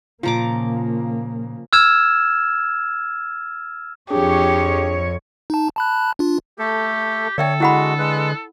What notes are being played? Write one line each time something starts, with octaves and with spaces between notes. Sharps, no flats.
A#2 C#3 F3 A#3 F4 A#5 D6
E6 F6 G#6 E7
F2 D4 G4 G#4 C#5
D#4 A5
A5 B5 F#6
D4 F4
A3 G4 A4
D3 A4 C#5 D5 E5 G5
G#3 E4 F#4 F#5 B5
G#3 B4